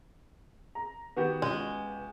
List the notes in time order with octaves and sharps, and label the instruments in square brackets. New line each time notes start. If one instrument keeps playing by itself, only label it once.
[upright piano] A#5
[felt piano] D#3 [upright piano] B3 F#4 G4
[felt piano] C#2 [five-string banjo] G#3